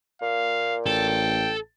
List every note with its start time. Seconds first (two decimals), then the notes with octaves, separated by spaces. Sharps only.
0.22 A#2 F5
0.86 A1 A4 G5